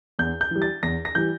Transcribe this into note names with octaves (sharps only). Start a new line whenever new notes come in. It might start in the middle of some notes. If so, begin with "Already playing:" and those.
E2 G6
G6
E3 G3
A6
E2 A#6
A#6
E3 G3 G6